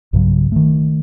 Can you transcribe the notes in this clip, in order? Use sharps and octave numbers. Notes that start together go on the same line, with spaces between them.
B1 G2 C#3 F#3
D#3 A3